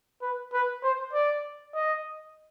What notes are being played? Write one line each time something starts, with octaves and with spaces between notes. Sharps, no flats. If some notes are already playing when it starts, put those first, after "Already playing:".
B4
B4
C5
D5
D#5